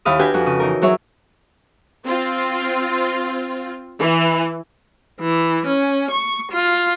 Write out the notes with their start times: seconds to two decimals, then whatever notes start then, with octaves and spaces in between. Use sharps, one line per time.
0.05 D#2 E4 F5 B5 D#6
0.19 D4 D#4 F#4 G4 B4 G#5
0.34 F2 F#4
0.46 C#3 D#6
0.60 E3 D#4 A#4
0.82 F#3 E4 G#4 C#5 E5
2.06 C4 F4
3.99 E3
5.20 E3
5.66 C#4
6.10 C#6
6.51 F4